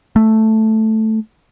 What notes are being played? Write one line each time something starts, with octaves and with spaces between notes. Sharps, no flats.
A3